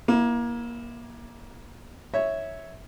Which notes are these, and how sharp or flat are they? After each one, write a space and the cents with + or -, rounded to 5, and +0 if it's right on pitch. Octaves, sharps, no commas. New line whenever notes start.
A#3 +25 E4 +0
C#5 +0 E5 -10